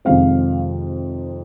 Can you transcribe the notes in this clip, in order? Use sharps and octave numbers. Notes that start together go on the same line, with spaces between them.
F2 C3 D#3 G#3 C4 F5